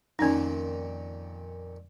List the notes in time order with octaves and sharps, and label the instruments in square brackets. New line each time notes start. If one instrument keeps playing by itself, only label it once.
[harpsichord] F2 A#2 D#3 [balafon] C#4 D#4